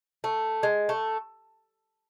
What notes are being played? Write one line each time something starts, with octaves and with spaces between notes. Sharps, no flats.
A3
G#3
A3